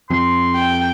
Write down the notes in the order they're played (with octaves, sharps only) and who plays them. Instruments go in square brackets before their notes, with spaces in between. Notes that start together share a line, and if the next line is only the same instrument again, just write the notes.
[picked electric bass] F2 [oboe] C6
[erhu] G5